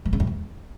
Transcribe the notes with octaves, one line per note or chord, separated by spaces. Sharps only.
E3
C#3
F#2
E2